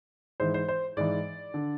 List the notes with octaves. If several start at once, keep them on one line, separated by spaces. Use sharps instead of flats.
G#2 E3 C5
C5
C5
G#2 E3 D5
D3